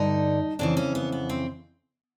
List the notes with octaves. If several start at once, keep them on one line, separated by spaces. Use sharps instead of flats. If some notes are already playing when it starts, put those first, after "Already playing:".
Already playing: G2 D3 D#4
F2 C#3 E3 D4
C#4
B3
B3
C4